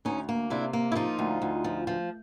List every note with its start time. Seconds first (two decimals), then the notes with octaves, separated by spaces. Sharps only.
0.05 D2 C#4 D#4
0.29 A#3
0.50 C3 D4 E4
0.73 A#3
0.92 E4
0.95 F3 D#4 F4
1.19 D2
1.42 D2
1.64 F3
1.87 F3